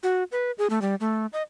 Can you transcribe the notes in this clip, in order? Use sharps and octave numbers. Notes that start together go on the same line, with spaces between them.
F#4
B4
G#4
A3
G3
A3
D#5